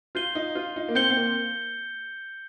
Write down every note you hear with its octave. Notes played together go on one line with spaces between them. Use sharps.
F4 G6 C7 D#7 G7
D#4
F4
D#4
A#3
C4 G6 C#7 G7
C4
A#3